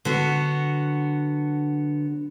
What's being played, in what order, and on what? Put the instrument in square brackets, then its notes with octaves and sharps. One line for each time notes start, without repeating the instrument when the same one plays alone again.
[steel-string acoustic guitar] D3 F#3 B3 F#4